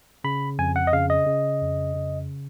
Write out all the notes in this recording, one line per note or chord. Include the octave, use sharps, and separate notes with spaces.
C#3 B5
F2 G#5
F#5
D#5
C#3 F5
D#5
C#3
F2
C#3